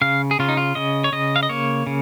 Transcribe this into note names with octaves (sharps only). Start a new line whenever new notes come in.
C#3 F5
G#4
C#3 F4
D#4
F4
C#3 D#5
C#5
C#3 D#5
F5
D#5
A#3 C#5
C#3